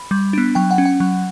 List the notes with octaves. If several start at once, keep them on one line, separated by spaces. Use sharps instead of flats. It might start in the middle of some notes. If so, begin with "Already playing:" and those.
Already playing: B5
G3
B3 D4
F#3 G5
F#5
C#4
F#5
F#3